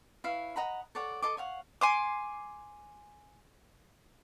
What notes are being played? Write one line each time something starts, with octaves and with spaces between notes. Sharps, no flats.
E4 B4 C#5 F5
D#5 F#5 A#5 B5
A4 C#5 D5 F#5
A4 D#5 C6 D6
C#5 F5 F#5
G#5 C6 D6